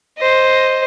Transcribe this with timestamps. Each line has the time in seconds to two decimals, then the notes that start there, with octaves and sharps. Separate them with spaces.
0.18 C5 D#5